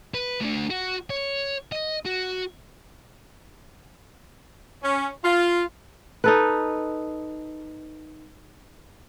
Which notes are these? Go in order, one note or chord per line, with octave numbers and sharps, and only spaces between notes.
B4
A3 D4
F#4
C#5
D#5
F#4
C#4
F4
D#4 A4 B4